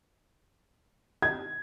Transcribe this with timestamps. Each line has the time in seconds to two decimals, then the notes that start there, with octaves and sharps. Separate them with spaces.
1.22 G#6